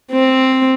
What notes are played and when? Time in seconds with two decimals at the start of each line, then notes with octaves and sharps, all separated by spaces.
0.13 C4